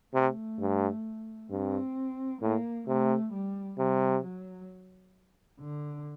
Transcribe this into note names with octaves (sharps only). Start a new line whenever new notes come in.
C3 A3
G2
G2 C4
A2 A#3
C3 A3
G3
C3 G3
F#3
D3